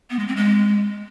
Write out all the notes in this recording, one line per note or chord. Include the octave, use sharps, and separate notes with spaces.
B3
G#3
C4
G#3